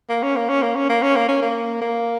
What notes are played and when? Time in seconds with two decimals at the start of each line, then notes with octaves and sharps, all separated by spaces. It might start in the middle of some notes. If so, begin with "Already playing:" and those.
0.09 A#3
0.23 C#4
0.36 A#3
0.49 C#4
0.62 A#3
0.76 C#4
0.89 A#3
1.02 C#4
1.16 A#3
1.29 C#4
1.42 A#3
1.81 A#3